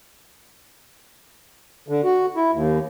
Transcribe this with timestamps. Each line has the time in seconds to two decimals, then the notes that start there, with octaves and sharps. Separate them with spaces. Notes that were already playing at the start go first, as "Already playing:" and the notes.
1.88 D3
2.04 F#4
2.36 E4
2.52 D#2